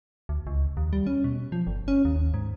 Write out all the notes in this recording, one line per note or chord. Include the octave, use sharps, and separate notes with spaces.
D2
C#2
D#2
G3
C#4
B2
F3
G1
C#4
D#2
G#2